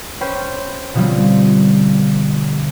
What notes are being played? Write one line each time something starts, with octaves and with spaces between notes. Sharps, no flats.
C#4 B4 C5 G5
B2 D3 F3 G3 C4